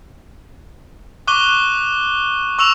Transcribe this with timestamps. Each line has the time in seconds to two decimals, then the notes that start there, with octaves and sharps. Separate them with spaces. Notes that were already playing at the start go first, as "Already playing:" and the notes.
1.27 C#6 D6 F#6 D#7 G7
2.59 C#6 E6 E7 F7